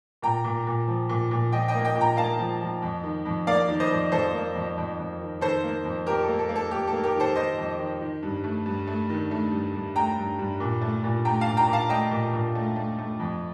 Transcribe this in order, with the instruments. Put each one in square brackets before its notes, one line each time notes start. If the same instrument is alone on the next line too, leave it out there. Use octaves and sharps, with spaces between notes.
[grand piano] A#2 G5 A#5
A#2
A#2
F3
A#2
A#2
F3 D#5 G5
D#5 G5
A#3
D#5 G5
A#2
G5 A#5
A#3 F5 A5
F3
F3
F2
D#3
F2
A#3 D5 F5
D#3
C5 D#5
F2
F2 A4 C5
A#3
F2
F2
F2
D#3
D#3 A4 C5
A#3
F2
F2 G4 A#4
A4
A#3
A4
A#3
A4
A#3 G4
A4
A#3
G4 A#4
D#3
A4 C5
D#3 C5 D#5
F2
D#3
D#3
G2
A3
G2
A3
D#3
A3
G2
G2
A3 G5 A#5
G2
G2
A#2
A3
A#2
A3 G5 A#5
F5 A5
A#2
G5 A#5
A#2
F5 A5
A3 D#5 G5
A#2
A#2
A3
A3
A3
F2